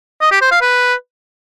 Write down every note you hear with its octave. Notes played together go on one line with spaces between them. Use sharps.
D#5
G4
C5
F5
B4